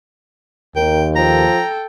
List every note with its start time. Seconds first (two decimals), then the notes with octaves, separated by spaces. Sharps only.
0.76 D#2 A#4 G5
1.16 F3 A4 G5 A#5